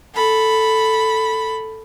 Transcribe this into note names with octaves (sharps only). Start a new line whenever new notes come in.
A4 B5